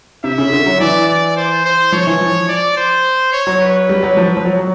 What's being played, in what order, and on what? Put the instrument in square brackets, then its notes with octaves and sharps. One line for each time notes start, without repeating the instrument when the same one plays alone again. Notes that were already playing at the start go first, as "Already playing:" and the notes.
[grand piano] C3 [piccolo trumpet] E5
[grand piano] C#3
D3
F#3
[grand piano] E3 [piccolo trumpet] D5
[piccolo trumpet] D5
C5
C5
[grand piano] F3 [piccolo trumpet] C#5
[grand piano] E3
F3
[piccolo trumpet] D5
C5
C#5
[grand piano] F#3
[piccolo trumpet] B4
[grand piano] G3
F#3
F3
F3
F#3
F#3